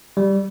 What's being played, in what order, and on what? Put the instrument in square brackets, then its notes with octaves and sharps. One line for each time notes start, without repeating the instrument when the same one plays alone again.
[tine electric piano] G3